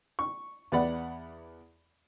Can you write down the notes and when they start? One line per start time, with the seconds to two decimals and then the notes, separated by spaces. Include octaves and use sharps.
0.19 C#6
0.72 E2 B3 D5 F#5 B5